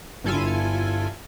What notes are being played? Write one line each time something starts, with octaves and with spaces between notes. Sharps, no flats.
G1 G2 E4 F4 A4 G#5